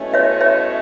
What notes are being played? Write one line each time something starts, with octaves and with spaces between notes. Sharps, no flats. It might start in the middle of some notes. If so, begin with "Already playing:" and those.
Already playing: B2 A3 C#4 E4
C#5 E5
C#5 E5